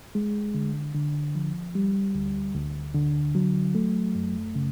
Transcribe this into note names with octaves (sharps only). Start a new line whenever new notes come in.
G#3
D3
D3
F3
G3
D2
D2
D3
F#3
A3
F#2
C#3